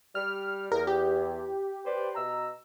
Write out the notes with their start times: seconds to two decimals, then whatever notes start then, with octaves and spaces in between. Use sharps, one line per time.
0.15 G3 F6
0.72 E2 A#4
0.87 G4
1.85 B4 C5 D5
2.15 B2 A#5 E6